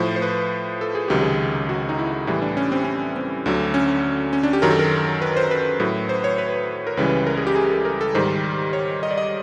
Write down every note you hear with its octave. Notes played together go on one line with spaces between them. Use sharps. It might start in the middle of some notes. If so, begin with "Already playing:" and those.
Already playing: A2 F3 C5
C5
B4
A4
G#4
C#2 C3 D#3 F#3 G4
G#4
F#4
D#4
E4
A2 E3 G3
D4
C#4
C4
C#4
C4
D2 D3 F#3
C#4
C#4
D4
G4
F#2 D#3 F#3 A#4
A4
A#4
B4
C5
B4
A2 F#3
C5
C#5
B4
A#4
C#2 C#3 E3 G3 B4
A#4
G#4
G4
G#4
A4
A#4
A4
G#2 D#3 G3 C5
C#5
D#5
D5
D#5